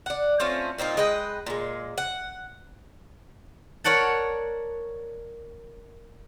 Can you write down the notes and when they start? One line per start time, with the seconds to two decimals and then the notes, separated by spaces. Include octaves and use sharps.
0.06 D5 F#5
0.40 A3 C4 C#4 F4
0.78 A#2 C4 D#4 F4
0.97 G#3 B4 D#5 G5
1.46 A#2 G#3
1.98 F#5
3.84 A#4 C#5 D5 F#5 A5